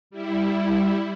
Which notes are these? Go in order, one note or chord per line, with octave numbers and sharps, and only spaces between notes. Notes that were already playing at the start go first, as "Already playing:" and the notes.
G3 E4